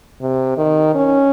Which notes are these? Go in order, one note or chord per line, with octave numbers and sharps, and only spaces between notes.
C3
D#3
C#4